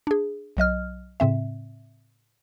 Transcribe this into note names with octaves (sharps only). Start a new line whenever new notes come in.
D4 G#4
B1 F#3 D#5 F6
A2 C#3 C4 E5